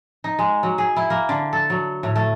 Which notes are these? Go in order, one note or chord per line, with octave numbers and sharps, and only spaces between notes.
D#4
G#3
F#3
G#4
E4
A#3
D3
A4
F#3
A2
A3